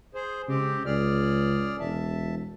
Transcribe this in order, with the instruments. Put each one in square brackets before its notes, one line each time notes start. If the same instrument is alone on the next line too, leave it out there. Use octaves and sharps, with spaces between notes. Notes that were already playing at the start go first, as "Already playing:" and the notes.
[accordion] G#4 C5
[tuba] C#3 [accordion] G#3 C4 G4
[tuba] C#2 [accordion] G#4 D5 F6
[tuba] E1 [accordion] E5 A5